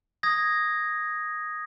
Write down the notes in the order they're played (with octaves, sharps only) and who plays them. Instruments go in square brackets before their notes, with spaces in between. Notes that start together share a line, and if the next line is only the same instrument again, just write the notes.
[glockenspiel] D#6 G#6 A#6